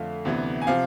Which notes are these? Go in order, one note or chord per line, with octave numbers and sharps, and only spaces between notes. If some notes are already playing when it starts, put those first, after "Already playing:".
Already playing: F2 D3 A3 F5
D2 C3 E3 B3
G#5
C3 F3 F5